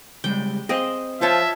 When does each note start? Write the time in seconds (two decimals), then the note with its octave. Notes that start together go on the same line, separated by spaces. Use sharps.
0.24 C#3 G3 G#3 G5
0.69 C4 G#4 D#5 F5 G5
1.21 F3 F4 C#5 E5 A5